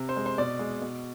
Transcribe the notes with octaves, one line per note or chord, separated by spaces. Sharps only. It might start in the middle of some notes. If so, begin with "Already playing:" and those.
Already playing: C3
C5
G#3
C5
B2 D5
G#3
B2